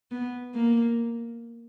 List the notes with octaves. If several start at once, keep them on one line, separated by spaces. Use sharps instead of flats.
B3
A#3